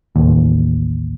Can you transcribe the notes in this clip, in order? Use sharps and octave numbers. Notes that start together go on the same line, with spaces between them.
A1 D#2